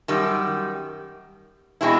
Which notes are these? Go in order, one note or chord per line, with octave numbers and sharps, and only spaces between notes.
F#2 D#3 G3
B2 G#3 C4 E4